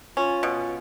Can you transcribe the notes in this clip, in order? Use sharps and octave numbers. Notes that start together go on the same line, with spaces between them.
C#4 F4
B2